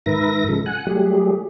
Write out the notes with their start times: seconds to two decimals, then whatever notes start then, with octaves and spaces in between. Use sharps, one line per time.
0.06 G#2 D#3 A#4 B4 E5 A#6
0.48 C#3 F3 G#3 A4
0.66 F#5 G#5 F#6
0.87 F#3 G3 A3 G4 G#4